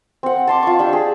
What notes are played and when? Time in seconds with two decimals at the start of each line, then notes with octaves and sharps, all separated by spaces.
0.23 C4 F#5
0.47 A5 C6 D6
0.63 F4 C#6
0.79 D4 G4 E6
0.93 G#4